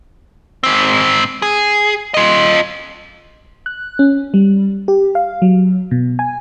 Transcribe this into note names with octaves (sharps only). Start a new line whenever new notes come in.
G#2 C4
G#4
F4 D#5
F#6
C#4
G3
G4
F5
F#3
B2
G#5